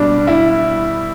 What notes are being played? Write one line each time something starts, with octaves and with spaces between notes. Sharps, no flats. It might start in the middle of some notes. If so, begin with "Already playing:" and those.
Already playing: B2 G3 D4
E4